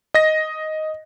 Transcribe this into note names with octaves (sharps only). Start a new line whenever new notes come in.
D#5 A#6